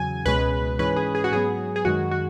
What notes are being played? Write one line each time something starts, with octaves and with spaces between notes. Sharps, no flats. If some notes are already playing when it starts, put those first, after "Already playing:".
Already playing: E2 C#3 F#3 G#5
C#2 B2 G#3 C#4 B4
G#2 E3 G#3 C#4 B4
G#4
G#4
F#4
G#2 F#3 B3 G#4
G#4
F#2 D#3 G#3 F#4
F#4